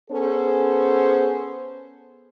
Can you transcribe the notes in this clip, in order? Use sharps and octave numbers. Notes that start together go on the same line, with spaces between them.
B3 C#4 G#4 A4 C5